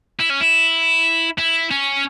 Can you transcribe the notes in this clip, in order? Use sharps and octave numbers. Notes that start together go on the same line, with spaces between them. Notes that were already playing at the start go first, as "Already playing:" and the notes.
E4
C#4
E4
E4
C#4